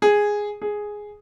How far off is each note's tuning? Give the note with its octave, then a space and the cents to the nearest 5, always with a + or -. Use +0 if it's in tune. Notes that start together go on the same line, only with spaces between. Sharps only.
G#4 -5
G#4 +0